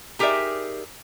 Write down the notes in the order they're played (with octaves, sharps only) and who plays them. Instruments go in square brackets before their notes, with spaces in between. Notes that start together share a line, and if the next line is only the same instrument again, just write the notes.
[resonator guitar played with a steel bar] D#4 G4 G#4 A#4 D5 E5